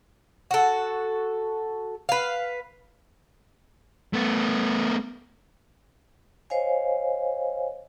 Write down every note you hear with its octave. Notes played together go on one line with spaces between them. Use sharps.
F#4 A4
B4 F5
A3 B3
C5 C#5 D#5 F5 G#5